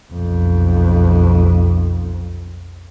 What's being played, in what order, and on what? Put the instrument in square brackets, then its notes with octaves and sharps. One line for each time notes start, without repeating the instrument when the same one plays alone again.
[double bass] B1 F2